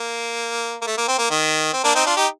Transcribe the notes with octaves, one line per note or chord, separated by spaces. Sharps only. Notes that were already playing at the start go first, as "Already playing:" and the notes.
Already playing: A#3
A#3
A3
A#3
C4
A#3
D#3
C4
A#3 D4
C4 D#4
D4 F4
D#4 G4